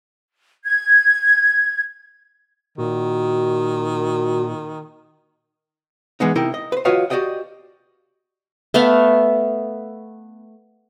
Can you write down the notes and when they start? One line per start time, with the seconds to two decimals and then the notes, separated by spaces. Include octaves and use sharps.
0.65 G#6
2.78 A#2 D#3 F#4
6.20 E3 G#3 B3 D#4
6.35 C3 D#4 E4 A#4 G5
6.54 D#5
6.72 B4 C5
6.85 F4 F#4 B4 C#5 D#5 F5
7.10 F#4 G4 D5 D#5 G5
8.74 A3 B3 E5 F5